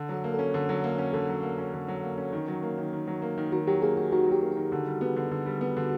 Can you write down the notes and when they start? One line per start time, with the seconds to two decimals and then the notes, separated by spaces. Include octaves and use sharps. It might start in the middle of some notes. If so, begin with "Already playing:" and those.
Already playing: D3
0.09 F#3 A4
0.24 A#3
0.34 C#4 A4
0.54 D3
0.69 F#3
0.84 A#3
0.98 C#4
1.13 D3 A4
1.28 F#3
1.43 A#3
1.58 C#4
1.74 D3
1.88 F#3
2.03 A#3
2.18 C#4
2.33 D#3
2.48 F#3
2.63 A#3
2.78 D#3
2.93 D#3
3.07 F#3
3.22 A#3
3.38 D#3
3.52 D#3 F#4
3.67 F#3 G4
3.82 A#3 G#4
3.97 D#3 F#4
4.12 D#3 F#4
4.27 F#3
4.32 G4
4.42 A#3
4.52 G4
4.57 D#3
4.72 D3
4.86 G3
5.01 B3
5.16 D3
5.31 D3
5.46 G3
5.61 B3
5.77 D3